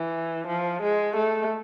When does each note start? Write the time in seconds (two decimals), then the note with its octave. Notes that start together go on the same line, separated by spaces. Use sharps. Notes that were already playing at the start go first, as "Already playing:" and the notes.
Already playing: E3
0.47 F3
0.82 G#3
1.16 A3